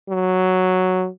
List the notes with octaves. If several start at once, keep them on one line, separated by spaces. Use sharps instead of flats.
F#3